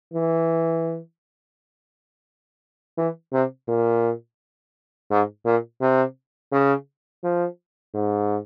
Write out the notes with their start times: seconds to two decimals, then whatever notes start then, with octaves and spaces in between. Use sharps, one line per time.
0.14 E3
2.98 E3
3.33 C3
3.68 A#2
5.11 G#2
5.45 A#2
5.81 C3
6.52 C#3
7.24 F3
7.94 G#2